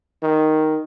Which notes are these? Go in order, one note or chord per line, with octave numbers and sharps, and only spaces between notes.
D#3